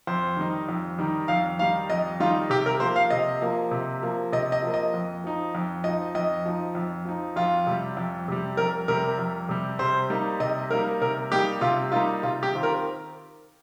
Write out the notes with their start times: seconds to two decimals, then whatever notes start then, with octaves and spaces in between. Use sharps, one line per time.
0.07 F2 C5
0.37 D#3 G3 D#4
0.69 F2
0.98 D#3 G3 D#4
1.28 F2 F5
1.59 D#3 G3 D#4 F5
1.90 F2 D#5
2.20 D#3 G3 D#4 F4
2.50 C3 G4
2.66 A#4
2.80 F3 A#3 C5
2.96 F5
3.10 C3 D#5
3.42 F3 A#3
3.71 C3
4.02 F3 A#3
4.32 C3 D#5
4.52 D#5
4.62 F3 A#3
4.74 D#5
4.94 F2
5.24 F3 D#4
5.55 F2
5.84 F3 D#4 D#5
6.15 F2 D#5
6.46 F3 D#4
6.75 F2
7.05 F3 D#4
7.36 F2 F4
7.67 C3 G3
7.97 F2
8.28 C3 G3
8.57 F2 A#4
8.88 C3 G3 A#4
9.18 F2
9.49 C3 G3
9.79 C3 C5
10.10 G3 A#3 D#4
10.40 C3 D#5
10.71 G3 A#3 D#4 A#4
11.01 C3 A#4
11.32 G3 A#3 D#4 G4
11.61 C3 F4
11.92 G3 A#3 D#4 F4
12.23 C3 F4
12.43 G4
12.54 D#3 C4 F4
12.63 A#4